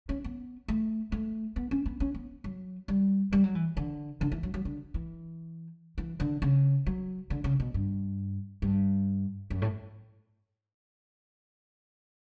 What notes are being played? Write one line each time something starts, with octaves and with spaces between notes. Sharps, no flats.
C#4
B3
A3
A3
B3
C#4
B3
C#4
B3
F#3
G3
G3
F#3
E3
D3
D3
E3
F#3
F#3
D3
E3
E3
D3
C#3
F#3
D3
C#3
B2
G2
G2
F#2
A2